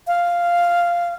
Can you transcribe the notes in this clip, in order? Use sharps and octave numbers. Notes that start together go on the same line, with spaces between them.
F5